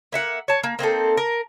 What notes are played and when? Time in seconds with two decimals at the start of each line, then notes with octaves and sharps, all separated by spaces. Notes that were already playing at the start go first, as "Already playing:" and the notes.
0.12 A#3 E5 F#5
0.48 C#5 A5
0.63 A#3
0.79 A#3 C4 D#4 A4
1.17 A#4